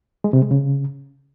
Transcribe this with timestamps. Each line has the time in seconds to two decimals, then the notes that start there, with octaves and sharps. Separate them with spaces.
0.24 G#3
0.33 C3
0.42 G#3
0.51 C#3